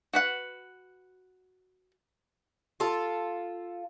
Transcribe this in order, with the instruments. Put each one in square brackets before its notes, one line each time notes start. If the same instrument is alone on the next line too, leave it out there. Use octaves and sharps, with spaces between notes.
[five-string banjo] F#4 B4 F#5
[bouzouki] F4 A4